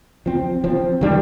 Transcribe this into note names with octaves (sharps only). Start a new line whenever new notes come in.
F3 C4
F3 C4
D#3 G3 D4